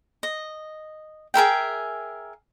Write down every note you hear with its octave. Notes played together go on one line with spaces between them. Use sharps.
D#5
G#4 A#4 E5 G5